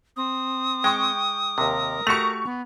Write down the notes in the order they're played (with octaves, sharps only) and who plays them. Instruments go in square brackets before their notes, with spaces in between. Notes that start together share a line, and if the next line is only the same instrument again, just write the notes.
[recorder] C4 [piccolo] D#6
[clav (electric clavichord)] G#3 [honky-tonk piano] G5 C#6
[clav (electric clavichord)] D#2 C3 [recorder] A#4
[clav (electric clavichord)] A3 F#4 G4 [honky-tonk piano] C#6 F7
[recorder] B3